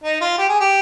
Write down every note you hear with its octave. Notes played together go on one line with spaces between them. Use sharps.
D#4
F4
G4
G#4
G4